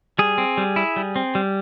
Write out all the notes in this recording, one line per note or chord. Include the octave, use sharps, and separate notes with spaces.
G3 G#4
C4
G3
E4
G3
C4
G3